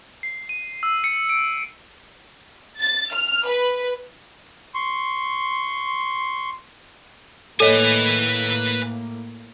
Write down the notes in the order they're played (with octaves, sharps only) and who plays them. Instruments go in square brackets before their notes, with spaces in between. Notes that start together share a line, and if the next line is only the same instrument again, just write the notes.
[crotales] C7
D#7
E6
C#7
D7
[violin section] A6
F6
B4
[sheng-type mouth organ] C6 C#6
[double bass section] A2 A#3 [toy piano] A4 C#5 D#5 [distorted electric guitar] B4 G#5